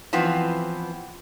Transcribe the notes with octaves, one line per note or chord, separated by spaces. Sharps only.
E3 F3 B3 C4